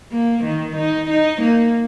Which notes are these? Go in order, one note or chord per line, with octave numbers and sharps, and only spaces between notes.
A#3
D#3
D#4
D#4
A#3